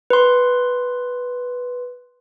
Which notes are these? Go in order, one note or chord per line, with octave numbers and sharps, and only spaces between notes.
B4 C6